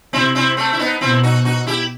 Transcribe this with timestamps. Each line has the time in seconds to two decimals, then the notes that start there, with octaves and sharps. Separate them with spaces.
0.13 C3 C4 E4
0.35 C4 E4
0.57 A3 C4
0.73 E4
0.79 B3 D#4
1.01 B2 C4 E4
1.23 D#4 F#4
1.45 D#4 F#4
1.67 E4 G4